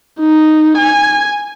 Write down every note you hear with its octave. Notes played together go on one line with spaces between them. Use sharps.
D#4
G#5